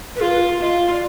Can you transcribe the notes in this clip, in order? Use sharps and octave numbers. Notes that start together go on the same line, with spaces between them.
B4
F4 G#4
B4
F4 D#5
D5